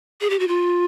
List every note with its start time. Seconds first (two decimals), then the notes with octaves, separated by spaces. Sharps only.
0.21 G#4
0.30 G4
0.39 F#4
0.48 F4